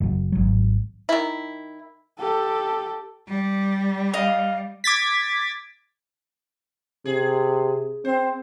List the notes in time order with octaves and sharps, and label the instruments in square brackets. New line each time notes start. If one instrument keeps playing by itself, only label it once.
[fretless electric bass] F#1 F#2
G#1 F#3
[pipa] D#3 E4
[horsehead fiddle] G4 A4
[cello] G3
[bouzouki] D#5 F5
[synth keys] D6 G#6 A6 B6
[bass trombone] C3 [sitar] G#4
[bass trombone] C4 [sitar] C5